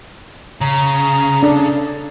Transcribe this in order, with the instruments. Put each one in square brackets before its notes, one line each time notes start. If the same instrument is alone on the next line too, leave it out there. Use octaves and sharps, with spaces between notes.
[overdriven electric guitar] C#3 [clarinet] A#5
[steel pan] D4 [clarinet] A4